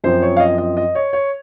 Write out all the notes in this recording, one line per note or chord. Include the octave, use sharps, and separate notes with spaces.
F#2 F3 C4 C5
C#5
F5
D#5
D#5
D#5
C#5
C#5